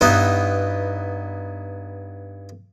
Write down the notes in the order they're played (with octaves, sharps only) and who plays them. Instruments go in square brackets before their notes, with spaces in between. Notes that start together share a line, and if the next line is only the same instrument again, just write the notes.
[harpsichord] G2 B3 D#4 E4